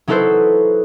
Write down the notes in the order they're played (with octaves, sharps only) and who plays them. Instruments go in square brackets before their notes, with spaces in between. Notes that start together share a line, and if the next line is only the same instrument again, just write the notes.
[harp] F#3 D#4 E4 A4 B4 C5